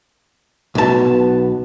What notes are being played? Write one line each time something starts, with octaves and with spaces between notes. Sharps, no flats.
B1 B3 A5